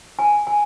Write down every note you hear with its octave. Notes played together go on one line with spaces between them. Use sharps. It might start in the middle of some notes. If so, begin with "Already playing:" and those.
G#5
G#5